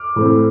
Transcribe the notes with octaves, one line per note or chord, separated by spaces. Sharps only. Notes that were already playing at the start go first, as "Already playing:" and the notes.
Already playing: D6 F6
A2 E3 A3 C4